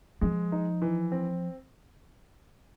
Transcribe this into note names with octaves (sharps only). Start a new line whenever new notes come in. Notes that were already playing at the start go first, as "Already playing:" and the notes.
F3 G#3
D#4
E3
C4